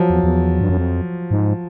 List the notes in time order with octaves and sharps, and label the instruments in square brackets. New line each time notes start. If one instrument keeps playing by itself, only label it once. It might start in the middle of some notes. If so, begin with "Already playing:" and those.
Already playing: [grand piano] F3 F#3
[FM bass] E2
E2
G2
F#2
F2
G#2